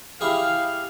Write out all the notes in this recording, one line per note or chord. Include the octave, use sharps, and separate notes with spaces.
E4 G4 G#4 F5